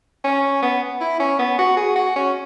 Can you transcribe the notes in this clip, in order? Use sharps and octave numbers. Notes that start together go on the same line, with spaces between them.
C#4
B3
E4
C#4
B3
F#4
G#4
F#4
C#4